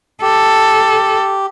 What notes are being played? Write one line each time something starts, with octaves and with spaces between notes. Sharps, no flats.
G4 A4